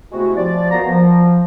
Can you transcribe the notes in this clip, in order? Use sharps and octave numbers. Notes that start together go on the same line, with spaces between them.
C3 G#3 A3 B3 E4 F#4
F3 D5
B2 A#3 B3 F#4 C5 A#5
F3